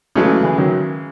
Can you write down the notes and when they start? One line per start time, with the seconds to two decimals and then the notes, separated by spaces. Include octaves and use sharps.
0.15 C#3 E3 F#3 G#3 A3
0.43 E3 G#3
0.57 D#3 F#3